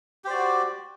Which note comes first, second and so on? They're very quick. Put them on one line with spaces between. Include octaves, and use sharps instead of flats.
G4 C5 D5 F#4